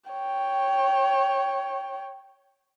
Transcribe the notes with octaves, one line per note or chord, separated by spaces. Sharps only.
C#5 G5